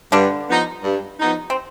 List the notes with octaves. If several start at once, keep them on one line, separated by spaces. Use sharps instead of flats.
G2 D3 D4
F3 B3 D#4
G2
F3 B3 D#4
C4